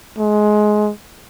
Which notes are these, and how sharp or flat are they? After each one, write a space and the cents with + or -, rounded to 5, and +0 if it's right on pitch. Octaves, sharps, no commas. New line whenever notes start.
G#3 +20